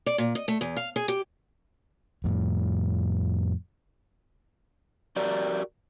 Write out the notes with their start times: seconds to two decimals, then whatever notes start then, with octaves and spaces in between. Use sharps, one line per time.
0.06 D5
0.18 A#2
0.35 D#5
0.48 A3
0.61 E2
0.76 F5
0.96 G#4
1.08 G4
2.24 F2 A2
5.16 F#4 G4 A#4 D5